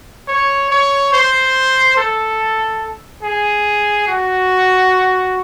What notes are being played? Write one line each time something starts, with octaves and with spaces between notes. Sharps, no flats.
C#5
C#5
C5
A4
G#4
F#4